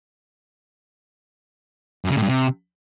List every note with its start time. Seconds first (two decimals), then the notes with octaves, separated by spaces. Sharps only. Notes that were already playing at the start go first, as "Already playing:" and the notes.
2.05 F#2
2.11 C#3
2.17 A2
2.23 G2
2.29 C3